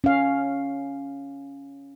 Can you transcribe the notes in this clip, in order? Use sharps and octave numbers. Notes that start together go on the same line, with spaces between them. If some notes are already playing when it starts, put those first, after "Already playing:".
C#4 F5